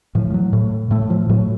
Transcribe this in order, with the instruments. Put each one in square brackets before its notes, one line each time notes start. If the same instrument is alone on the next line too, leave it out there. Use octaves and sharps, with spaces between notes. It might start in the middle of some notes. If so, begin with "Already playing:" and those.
[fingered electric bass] A2 F3
F3
F#3
A2
A2 A3
F3
A2 F#3